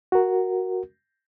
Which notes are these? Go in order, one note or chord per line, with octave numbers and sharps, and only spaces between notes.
F#4 A#4